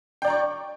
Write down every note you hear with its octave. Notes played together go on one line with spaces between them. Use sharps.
D5 G5 A#5 C#6